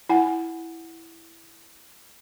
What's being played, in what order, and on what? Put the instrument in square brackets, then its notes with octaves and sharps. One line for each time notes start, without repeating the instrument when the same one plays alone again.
[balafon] E4 F#5 G#5